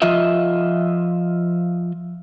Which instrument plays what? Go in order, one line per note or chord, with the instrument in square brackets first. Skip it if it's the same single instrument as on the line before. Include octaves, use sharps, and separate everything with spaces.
[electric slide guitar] F3 F4 D#5 E5